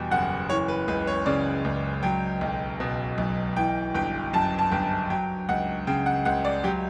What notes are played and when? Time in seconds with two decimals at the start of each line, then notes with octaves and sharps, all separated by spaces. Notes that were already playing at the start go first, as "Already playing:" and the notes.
Already playing: E2 B2 G3 G5
0.11 F#1 F#5
0.49 E3 C#5
0.68 B4
0.87 C#2 B4
1.07 C#5
1.26 C#3 D5
1.64 C#2
2.03 F#3 G5
2.41 B1
2.80 B2
3.18 B1
3.56 E3 G5
3.94 G1 G5
4.33 F#2 A5
4.59 A5
4.72 G1 G5
5.10 F#3 G5
5.48 C#2 F#5
5.87 C#3 G5
6.06 F#5
6.25 C#2 F#5
6.45 D5
6.64 F#3 G4